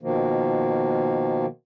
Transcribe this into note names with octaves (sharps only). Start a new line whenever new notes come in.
B2 D#3 F3 A#3